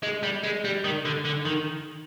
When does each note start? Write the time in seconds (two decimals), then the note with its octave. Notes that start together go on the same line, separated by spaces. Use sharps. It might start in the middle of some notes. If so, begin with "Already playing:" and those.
0.03 G#3
0.23 G3
0.43 G#3
0.65 G3
0.84 D#3
1.05 D3
1.25 D3
1.45 D#3